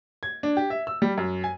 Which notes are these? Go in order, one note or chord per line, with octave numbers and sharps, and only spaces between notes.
G#6
D4
G4
E5
E6
G3
F#2
G#5